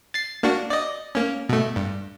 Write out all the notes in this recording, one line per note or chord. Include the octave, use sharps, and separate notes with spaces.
A6 C7
A#3 D4 F#4
D5 D#5
A#3 C#4
B2 A3
G2